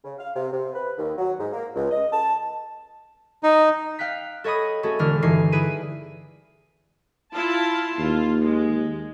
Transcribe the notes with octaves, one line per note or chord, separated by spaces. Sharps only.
C#3
F5
C3
C3
B4
D#2
F#3
G#2
A#3
C#2
D#5
A5
D#4
F5 G5 F#6 B6
A4 C#5 D#5 B5 D#6
A3 C#4 F#4 G#4 A4
E1 D3 G#3 D4 F6
G2 D3 E3 D#4 G#5 C7
E4 G#4 B4 D7 D#7
E4 F4 A5
D#2 F4
G#3